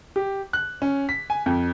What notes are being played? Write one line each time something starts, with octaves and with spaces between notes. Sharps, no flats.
G4
F#6
C#4
B6
G#5
F2